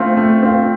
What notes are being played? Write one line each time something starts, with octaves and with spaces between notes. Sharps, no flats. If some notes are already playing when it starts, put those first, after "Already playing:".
Already playing: A3 C4 F4
A3
C4 F4